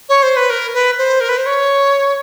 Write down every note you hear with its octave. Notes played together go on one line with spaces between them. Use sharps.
C#5
C5
B4
A#4
B4
C5
A#4
B4
C5
C#5